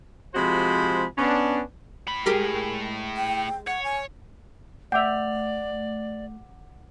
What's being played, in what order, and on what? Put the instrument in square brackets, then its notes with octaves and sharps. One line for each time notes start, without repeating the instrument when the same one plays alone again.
[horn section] C3 F3 G#3 F#4 C5 B5
B3 C#4 D4
[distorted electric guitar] A2 B5
[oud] G#3 G4 A#4
[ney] G5
[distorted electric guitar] C#5 [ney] F#5
[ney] G#5
[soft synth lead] A3 [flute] D5 [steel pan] E5 G5 [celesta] F#5 D6 F7